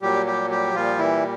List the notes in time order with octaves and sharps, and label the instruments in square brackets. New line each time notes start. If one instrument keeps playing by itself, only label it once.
[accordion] A#2 F#3 G3 G4
G3 G4
G3 G4
A#2 F3 G3 F4
E3 E4